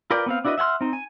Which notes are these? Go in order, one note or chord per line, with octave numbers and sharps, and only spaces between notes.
F4 A#4 B4 D5 G5
B3 C4 F5
D4 E4 F#4 B4 D#5
E5 F#5 G#5 C6 F6
C4 D#4
G#5